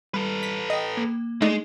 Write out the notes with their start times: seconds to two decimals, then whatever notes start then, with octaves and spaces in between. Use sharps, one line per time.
0.14 G3 A4 B4
0.43 B6
0.70 D#5 G5 D#6
0.97 A#3
1.42 G#3 A3 D4 D#4